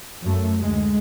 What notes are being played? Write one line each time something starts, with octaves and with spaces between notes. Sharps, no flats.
F#2 A3
D2 G#3